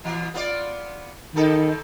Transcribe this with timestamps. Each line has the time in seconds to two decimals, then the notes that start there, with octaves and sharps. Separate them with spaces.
0.04 B2 E3
0.34 B3 F4 D5
1.35 D#2 D#3 D#4 A4